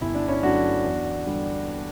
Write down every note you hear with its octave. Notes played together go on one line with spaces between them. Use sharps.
G1 E4
D4
C#4 E4
G2 F#3 A3 D4 F#4
E2
D3 G3